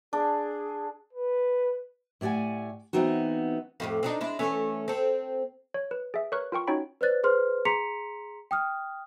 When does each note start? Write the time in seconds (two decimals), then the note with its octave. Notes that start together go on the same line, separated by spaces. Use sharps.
0.13 D4 G#4
1.13 B4
2.21 A2 G4 D5 F#5 G#5
2.93 E3 F3 B3 C4 D#4 F#4
3.80 F2 A2 G4
4.03 C4 D4 D#4
4.21 G#3 D4 E4
4.39 E3 A3 C#4
4.88 C4 A4
5.74 C#5
5.91 B4
6.14 G#4 E5
6.32 A#4 B4 C#5 C#6 F#6
6.52 F4 A#4 G5 C#6
6.67 C#4 D#4 F#4 C#5 G5 B5
7.01 B4 C5 D5 F#6 A6
7.23 G#4 B4 C5 C6 F6
7.65 G#4 A#5 C6 B6 C#7 F7
8.51 G5 D#6 F6